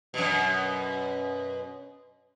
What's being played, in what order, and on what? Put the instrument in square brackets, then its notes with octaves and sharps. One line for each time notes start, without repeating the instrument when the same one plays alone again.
[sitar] F#2 B2